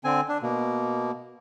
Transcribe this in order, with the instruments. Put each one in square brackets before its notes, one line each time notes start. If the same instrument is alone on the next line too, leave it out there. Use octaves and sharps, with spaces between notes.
[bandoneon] D3 C4 G#5
D4
B2 A#3